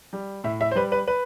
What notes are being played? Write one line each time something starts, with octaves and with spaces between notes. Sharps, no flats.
G3
A2 E5
E5
C5
G3 B4
B4
B4